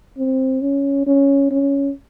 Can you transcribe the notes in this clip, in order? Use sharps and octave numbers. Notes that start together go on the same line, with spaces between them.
C4
C#4
C#4
C#4